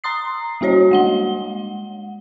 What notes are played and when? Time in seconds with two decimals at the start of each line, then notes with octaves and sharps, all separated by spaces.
0.04 A#5 C6 D#6 C7
0.61 G3 A#3 F#4 C#5 D#5
0.91 G#3 F#5 G7